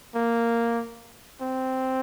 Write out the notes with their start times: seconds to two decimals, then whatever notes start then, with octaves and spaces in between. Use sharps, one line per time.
0.15 A#3
1.41 C4